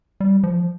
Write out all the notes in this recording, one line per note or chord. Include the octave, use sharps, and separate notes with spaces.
G3
F3